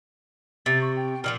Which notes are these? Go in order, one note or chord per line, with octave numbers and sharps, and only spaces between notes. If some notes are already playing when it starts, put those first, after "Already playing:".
C3 A6
C#6
G5
A#2 D#3 F3 F6